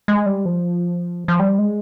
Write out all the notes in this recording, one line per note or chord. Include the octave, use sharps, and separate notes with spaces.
G#3
G3
F3
F3
G3
G#3